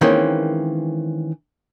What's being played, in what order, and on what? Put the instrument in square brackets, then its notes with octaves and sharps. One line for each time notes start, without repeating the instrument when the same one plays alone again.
[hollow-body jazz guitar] D#3 E3 G#3 A#3 C4 C#4